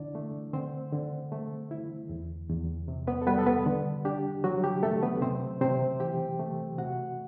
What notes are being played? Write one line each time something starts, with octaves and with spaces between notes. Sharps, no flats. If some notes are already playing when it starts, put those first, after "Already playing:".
Already playing: D3 D4 E4 D5
A3
D3 C4 C5
D3
A3
E4
E2
E2
C3
B3 B4
A4
G3 B3 B4
A4
B3 B4
D3
D4 G4
F#3 F#4
G4
A3 A4
B3 B4
C3 C4 C5
C3 C4 C5
E3 G4 G5
A3
C3 F#4 F#5